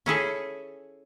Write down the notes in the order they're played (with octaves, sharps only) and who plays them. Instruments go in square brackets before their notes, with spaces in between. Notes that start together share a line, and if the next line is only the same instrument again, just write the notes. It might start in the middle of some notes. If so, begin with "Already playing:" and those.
[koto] C#4 E4 G#4 A4